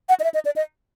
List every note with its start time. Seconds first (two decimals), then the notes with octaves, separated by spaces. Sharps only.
0.09 F#5
0.20 D#5
0.24 E5
0.34 D#5
0.45 D5
0.56 D#5